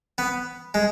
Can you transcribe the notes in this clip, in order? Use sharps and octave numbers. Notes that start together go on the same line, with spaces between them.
B3
G#3